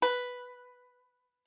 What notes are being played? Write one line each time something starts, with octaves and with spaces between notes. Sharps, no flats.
B4